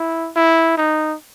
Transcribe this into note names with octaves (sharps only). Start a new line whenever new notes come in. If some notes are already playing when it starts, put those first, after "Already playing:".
Already playing: E4
E4
D#4